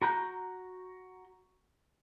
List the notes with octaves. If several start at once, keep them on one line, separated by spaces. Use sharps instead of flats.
F#4 A#5 F#6 G6